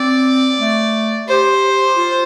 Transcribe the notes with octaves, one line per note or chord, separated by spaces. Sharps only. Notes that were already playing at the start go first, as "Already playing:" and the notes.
Already playing: C4 D5
A3
G4 C5
F4